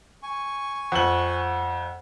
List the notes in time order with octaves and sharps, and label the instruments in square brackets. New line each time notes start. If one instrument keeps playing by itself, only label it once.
[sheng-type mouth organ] G#5 C#6
[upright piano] F2 F#7 [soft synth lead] F#5